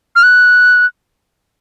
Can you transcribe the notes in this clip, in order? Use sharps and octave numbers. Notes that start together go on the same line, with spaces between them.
F6
F#6